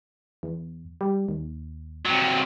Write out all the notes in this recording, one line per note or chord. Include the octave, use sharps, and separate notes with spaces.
E2
G3
D#2
C3 F#3